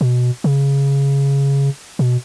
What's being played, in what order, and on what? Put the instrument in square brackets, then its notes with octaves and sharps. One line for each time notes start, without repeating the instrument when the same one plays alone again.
[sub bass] B2
C#3
B2